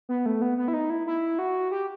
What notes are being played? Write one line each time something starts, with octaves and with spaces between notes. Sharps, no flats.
B3
A3
B3
B3
E4
D#4
E4
E4
F#4
G4